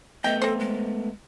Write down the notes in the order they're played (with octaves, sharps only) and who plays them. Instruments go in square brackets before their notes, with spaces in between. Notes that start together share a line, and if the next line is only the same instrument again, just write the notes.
[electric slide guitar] A3 B3 [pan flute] D#5 [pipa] G5
[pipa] C4 C5 [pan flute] A4
[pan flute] G#3